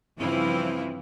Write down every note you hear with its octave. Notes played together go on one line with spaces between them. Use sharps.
G2 C#3 E3 F3 C4 E4